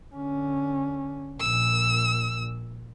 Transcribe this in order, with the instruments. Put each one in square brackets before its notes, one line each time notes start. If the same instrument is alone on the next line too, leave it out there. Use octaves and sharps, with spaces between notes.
[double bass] D3 C#4
[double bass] A#1 A#2 [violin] E6